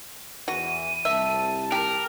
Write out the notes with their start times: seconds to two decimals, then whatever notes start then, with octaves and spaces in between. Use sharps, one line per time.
0.48 E2 E3 F#4 D#7
1.05 C2 E5 A5
1.72 G4 A#4